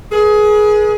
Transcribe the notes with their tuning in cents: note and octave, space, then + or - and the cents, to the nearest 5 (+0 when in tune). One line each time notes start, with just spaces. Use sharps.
G#4 +20 B4 -45